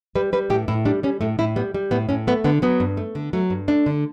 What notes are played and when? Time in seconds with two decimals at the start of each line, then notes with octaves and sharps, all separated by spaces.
0.15 G3 B4
0.33 G3 B4
0.50 A2 G4
0.68 A2 E4
0.85 G3 D4
1.03 G3 C#4
1.21 A2 A3
1.39 A2 E4
1.56 G3 B3
1.74 G3
1.91 A2 B3
2.09 A2 C#4
2.27 A3 B3
2.44 D3 B3
2.62 F#3 B3
2.80 G2
2.97 A3
3.15 D3
3.33 F#3 A3
3.50 G2
3.68 A3 D4
3.86 D3